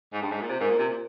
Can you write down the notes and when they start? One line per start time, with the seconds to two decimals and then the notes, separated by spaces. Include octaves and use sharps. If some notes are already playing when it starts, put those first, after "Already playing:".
0.13 G#2
0.23 G2 G#4
0.32 G#2
0.42 A#2
0.49 C3 C5
0.60 G#2 A#4
0.70 A#2
0.79 C3
0.89 A#2